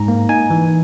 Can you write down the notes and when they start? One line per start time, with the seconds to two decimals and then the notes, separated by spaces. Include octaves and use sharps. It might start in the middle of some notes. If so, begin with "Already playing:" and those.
Already playing: G#2 A#5
0.08 A#3
0.29 D#4 G#5
0.50 E3